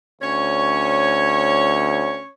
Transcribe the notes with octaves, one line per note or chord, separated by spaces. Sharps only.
D2 C#4 C#5